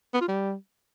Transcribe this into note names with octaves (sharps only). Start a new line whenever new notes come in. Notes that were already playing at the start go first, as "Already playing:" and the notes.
B3
F4
G3